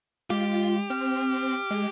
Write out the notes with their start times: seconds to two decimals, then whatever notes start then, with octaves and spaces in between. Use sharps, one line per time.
0.30 G#3 F4 G4
0.90 C4 F6
1.71 G#3